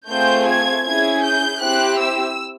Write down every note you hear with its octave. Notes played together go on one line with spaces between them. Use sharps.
A3 C4 F4 G#4 G6
G#6
C#4 E4 G#4 G#6
G6
C4 E4 G4 F#6
E6